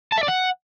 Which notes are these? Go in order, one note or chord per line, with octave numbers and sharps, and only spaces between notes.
A5
E5
D5
F#5